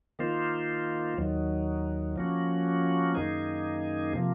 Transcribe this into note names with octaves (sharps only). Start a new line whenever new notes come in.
D#3 A#3 F4 C5
D#2 D#3 F#3
F3 A#3 C#4 F#4
F#2 D#3 A#3 D#4 G#4
C3 F3 A#3